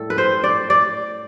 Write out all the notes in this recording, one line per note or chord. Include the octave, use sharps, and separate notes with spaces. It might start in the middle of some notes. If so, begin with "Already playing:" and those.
Already playing: A2 G3 A4
B4
C5
D5
D5